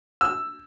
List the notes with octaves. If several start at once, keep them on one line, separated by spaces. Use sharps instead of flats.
E6